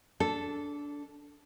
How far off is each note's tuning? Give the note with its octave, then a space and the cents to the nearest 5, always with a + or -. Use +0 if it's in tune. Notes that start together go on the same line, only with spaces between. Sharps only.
D4 -20 A4 +0